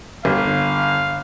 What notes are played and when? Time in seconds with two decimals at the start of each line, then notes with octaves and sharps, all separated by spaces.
0.25 G1 F5